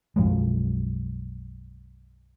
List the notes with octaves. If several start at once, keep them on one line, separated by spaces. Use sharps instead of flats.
B1 F#2 F3 G#3